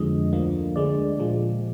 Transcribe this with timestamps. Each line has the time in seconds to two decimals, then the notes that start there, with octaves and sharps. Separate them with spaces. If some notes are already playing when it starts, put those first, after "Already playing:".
Already playing: F2 D3 F3 G#3 D#5
0.33 D2 D3 F3 A#3
0.76 D2 D3 G#3 D5
1.19 A#2 F3 G#3